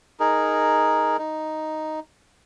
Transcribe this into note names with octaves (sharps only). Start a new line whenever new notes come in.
D#4 G#4 A#4
D#4